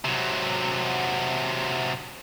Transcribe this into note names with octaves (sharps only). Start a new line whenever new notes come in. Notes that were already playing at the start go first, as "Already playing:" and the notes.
C3 F#3